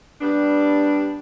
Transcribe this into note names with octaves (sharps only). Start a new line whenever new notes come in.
G3 B3 D4